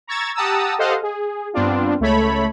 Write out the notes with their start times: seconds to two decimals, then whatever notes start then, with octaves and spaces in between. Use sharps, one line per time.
0.07 A#5 C#6 E6 G#6 A6
0.35 G4 F#5 A5 A#5 D#6 E6
0.78 G4 A4 C5 D#5 F5 F#5
1.03 G#4
1.53 G2 B3 C4 D4 F4
2.00 C#2 A3 A4 C#5 B5